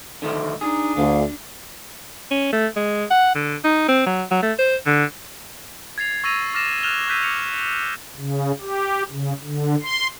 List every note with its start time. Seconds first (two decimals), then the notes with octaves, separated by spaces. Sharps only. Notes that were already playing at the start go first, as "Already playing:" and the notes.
0.22 D3 D#3 A3
0.61 D4 D#4 G#4
0.96 D2 F5
2.31 C#4
2.53 A3
2.76 G#3
3.11 F#5
3.35 D3
3.64 D#4
3.89 C4
4.06 F#3
4.31 F#3
4.43 A3
4.59 C5
4.87 D3
5.98 G#6 A6 C7 F7
6.24 C#6 E6 A6 A#6 D#7 F7
6.54 D6 F6 A6 A#6 E7
6.83 F6 F#6 A6 E7 F7 G7
7.08 D6 E6 F#6 G6 B6 D#7
7.23 D6 C#7 F7
8.17 C#3
8.61 G4
9.11 C#3
9.43 D3
9.82 C6